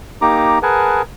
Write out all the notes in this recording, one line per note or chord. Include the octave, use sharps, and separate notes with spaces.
A#3 D#4 G4 A#5 D6
G#4 A#4 B4 F#5 G#5 A5